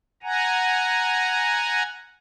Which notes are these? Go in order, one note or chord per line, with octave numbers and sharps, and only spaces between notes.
F#5 G#5 A#5